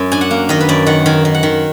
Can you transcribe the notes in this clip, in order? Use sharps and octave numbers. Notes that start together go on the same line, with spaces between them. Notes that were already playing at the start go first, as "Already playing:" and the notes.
Already playing: F#2
D4 G#5
F#5
A#3
D#3 D#5
B4
F#2 D5
D#3 F#5
D#3 G#5
D#3
F#5
D#3